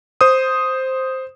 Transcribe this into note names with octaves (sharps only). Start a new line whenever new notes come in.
C5 D#6